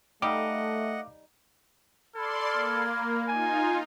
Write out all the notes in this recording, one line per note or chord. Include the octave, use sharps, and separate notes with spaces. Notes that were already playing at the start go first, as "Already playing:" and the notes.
G3 A3 D#4 D#5 F5 F#5 D6
A4 D5 B5 C6 F6 G#6
A#3
D#4 F4 G#5